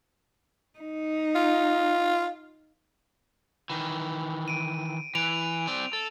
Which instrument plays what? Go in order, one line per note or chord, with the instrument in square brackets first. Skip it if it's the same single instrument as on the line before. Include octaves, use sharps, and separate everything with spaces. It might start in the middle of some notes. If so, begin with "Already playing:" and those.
[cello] D#4
[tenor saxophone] F4
[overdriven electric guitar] D#3 E3
[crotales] D7 D#7
[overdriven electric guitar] E3 [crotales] D7 F7
[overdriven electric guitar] C4 D5
A4